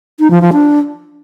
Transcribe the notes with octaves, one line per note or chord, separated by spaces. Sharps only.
D#4
F3
F3
D4